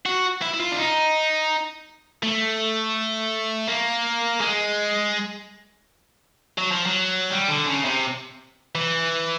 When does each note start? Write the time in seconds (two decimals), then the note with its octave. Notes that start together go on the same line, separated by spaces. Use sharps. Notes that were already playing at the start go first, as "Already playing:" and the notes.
0.06 F#4
0.42 E4
0.54 E4
0.60 F4
0.71 D4
0.78 D#4
2.23 A3
3.68 A#3
4.41 G#3
6.58 F#3
6.71 F3
6.86 F#3
7.30 G3
7.48 D3
7.67 C#3
7.85 C3
8.75 E3